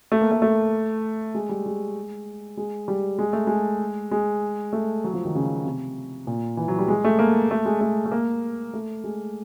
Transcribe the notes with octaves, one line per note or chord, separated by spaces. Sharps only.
A3
A#3
A3
A3
G#3
G3
G#3
G#3
G3
G#3
A3
G#3
G#3
A3
F#3
F3
D#3
C#3
C3
A#2
E3
F#3
G3
G#3
A3
A#3
A3
G#3
A3
A3
A#3
A3
G#3